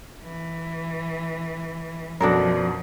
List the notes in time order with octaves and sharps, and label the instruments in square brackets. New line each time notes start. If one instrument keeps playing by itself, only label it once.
[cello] E3
[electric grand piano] F#2 B2 [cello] F3 [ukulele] D4 A4 A#4